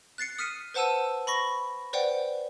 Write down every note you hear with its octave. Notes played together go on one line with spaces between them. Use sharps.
F#6 A6 C7 C#7
D#6 F6 B6 C#7 D#7
B4 C5 F#5 A5 E6 D#7
B5 C#6 A#6
B4 C5 D5 F#5 G5